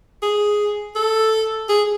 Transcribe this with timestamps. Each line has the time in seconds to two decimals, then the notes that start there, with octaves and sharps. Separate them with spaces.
0.22 G#4
0.95 A4
1.69 G#4